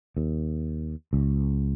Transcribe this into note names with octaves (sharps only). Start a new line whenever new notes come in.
D#2
C#2